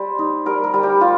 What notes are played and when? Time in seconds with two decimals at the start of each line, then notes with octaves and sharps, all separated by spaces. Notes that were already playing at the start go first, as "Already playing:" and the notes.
Already playing: G3 C5
0.19 D#4
0.46 G3 A#4
0.64 A#4
0.74 G3
0.83 G4
1.01 G3 F4